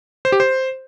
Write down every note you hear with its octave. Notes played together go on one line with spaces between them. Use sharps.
C5
G4
C5